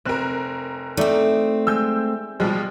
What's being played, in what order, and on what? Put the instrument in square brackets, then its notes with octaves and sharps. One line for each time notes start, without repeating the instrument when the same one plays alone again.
[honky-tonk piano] F1 A#4 [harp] C4 F#6 E7
[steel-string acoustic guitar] A3 C4 [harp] D#4 D5 E5
[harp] G#3 [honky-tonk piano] E6 G6
[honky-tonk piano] B2 F3 G#3 [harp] G3